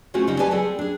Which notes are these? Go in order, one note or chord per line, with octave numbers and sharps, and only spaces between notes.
A3 C4 C#4 F4 F#4 G#4
C#3 G3 C4 D#4 G4
G4 B4 D5 G#5 A5
G3 C4 G#4 A4
D4 G#4